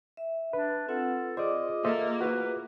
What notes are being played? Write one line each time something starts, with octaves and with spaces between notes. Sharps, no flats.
E5
D4 B4
C4 F4 A4 F#5
F4 G#4 C5 D5 D#5 D6
A#3 A4 C5 D#5 E5
E4 F#4 B4